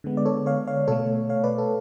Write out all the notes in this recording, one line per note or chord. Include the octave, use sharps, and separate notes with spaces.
D3 G#3 B3
D5
A4 C#5
C#5 F5
C#5 F5
B2 A3 A4 C#5
C#5 F5
B4 D5
A4